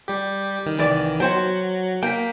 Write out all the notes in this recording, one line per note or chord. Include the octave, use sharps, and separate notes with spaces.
G3 G4
D#3
C2 E3 D5
F#3 F#4 C5 G5
A#3 G5 B6